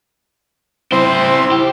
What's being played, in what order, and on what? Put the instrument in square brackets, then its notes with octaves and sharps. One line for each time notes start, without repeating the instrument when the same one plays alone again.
[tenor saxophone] C4 [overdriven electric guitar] E4 C5
[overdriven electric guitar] G4